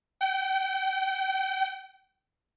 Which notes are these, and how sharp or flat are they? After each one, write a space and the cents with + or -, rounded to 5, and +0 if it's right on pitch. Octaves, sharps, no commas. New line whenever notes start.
G5 -35